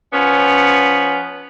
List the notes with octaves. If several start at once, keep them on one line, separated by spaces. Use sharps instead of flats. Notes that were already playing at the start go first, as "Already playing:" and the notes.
F3 B3 C#4